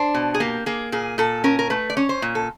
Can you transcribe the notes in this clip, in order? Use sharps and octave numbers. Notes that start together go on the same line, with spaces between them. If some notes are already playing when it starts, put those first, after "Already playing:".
Already playing: D4 C5
B2
G#4
A#3 G4
A#3 G#4
A#2 G#4
A#2 A4
C#4 A#4
A#4
A3 B4
D5
C#4 C#5
C5
A#2
A4